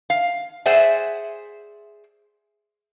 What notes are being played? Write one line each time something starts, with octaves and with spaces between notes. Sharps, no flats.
F5
G#4 C5 D5 E5 F#5 G#5